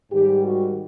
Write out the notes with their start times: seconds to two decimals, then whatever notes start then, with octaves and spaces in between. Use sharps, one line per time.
0.11 G#2 D#3 G3 G4
0.42 F#4